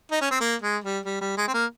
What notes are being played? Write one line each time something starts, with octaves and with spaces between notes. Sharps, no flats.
D#4
C#4
C4
A#3
G#3
G3
G3
G3
G#3
C4
A#3